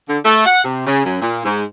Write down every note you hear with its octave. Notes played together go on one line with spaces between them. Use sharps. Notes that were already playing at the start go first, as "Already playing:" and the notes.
D3
A3
F#5
C3
C#3
F#2
A#2
G#2